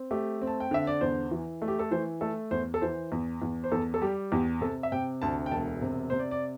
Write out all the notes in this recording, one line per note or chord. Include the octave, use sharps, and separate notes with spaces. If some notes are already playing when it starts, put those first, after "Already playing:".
Already playing: C4
A3 G4
C4
A5
G5
D3 E5
D5
E2 C5
E3
A3
G4
A4
E3 C5
A3 A4
E2 C5
A4
E3 C5
E2
E2
C5
E2 A4
A4
G3 G4
E2 G4
C3 A4
E5
C3 G5
D2 A5
G5
E1 A5
C3
C3 C5
D5
D5